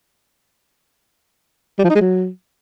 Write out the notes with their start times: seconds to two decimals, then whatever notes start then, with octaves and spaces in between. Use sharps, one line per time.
1.79 G3
1.84 F3
1.90 D#4
1.95 G#3
2.01 F#3